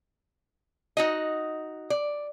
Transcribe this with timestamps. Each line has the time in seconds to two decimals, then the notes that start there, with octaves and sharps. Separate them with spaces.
0.97 D#4 F#4 D#5
1.90 D5